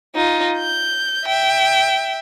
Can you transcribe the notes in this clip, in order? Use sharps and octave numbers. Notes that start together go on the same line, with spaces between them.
D#4 F4
G6
E5 G5